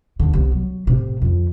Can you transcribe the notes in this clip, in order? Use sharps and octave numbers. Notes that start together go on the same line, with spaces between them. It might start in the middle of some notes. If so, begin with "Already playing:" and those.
D#2 D3
C2 B3
F#3
A2 C3
F2 D3